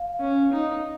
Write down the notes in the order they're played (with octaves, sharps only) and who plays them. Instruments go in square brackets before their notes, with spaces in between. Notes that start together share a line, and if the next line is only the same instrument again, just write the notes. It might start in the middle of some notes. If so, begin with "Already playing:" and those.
Already playing: [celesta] F5
[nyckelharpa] C#4
D#4